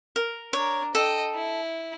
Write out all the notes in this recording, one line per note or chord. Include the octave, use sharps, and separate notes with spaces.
A#4
D4 A#4 C#5
A4 D#5 G5
E4